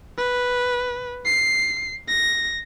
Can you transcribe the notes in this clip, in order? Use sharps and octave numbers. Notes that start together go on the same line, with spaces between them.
B4
C7
A#6